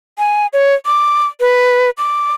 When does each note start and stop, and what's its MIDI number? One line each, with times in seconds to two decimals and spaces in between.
0.18 0.47 80
0.53 0.74 73
0.86 1.27 86
1.40 1.90 71
1.98 2.34 86